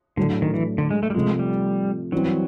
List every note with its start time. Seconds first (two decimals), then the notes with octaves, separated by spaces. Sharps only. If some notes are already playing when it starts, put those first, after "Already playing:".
0.17 A2 D3 F#3 A3 D4
0.42 D#3
0.54 E3
0.78 D3
0.91 G#3
1.03 A3
1.10 G3
1.14 C3 F3 G#3 A3
1.39 G3
2.12 E3 F#3 G3 C4